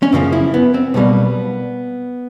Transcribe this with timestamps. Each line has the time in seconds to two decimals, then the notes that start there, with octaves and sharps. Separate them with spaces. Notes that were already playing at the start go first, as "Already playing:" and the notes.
0.03 C#4
0.12 F#2 C#3 F3 A#3 C4
0.32 E4
0.54 B3
0.74 C4
0.94 B1 B2 G3 A#3 B3